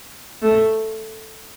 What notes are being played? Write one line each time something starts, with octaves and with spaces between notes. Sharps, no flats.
A3